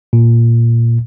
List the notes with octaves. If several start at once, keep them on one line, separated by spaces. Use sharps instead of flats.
A#2